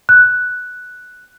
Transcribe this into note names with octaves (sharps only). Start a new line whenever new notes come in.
F#6